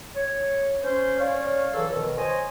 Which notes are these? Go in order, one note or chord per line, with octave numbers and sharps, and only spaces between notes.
C#5
C#4 C5
C#4 C#5 D5 F5
C#2 E3 F#3 A4
B2 D#3
C5 C#5 D#5 G#5